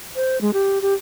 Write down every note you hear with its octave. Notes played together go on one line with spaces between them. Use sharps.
C5
G#3
G4
G4